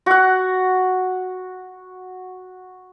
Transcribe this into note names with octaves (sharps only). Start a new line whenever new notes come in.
F#4 F#5